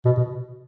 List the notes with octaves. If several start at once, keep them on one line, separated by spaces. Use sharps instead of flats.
B2
B2